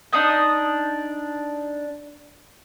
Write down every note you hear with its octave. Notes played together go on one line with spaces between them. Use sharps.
D4 D#4 D#6 G6